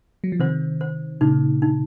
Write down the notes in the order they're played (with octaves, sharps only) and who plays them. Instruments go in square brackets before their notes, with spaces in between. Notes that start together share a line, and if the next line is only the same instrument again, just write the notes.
[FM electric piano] F#3
F3
[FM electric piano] C3 D#3 [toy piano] C5
[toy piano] C5
[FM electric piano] A#2 C#3 [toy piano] D#4
[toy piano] D#4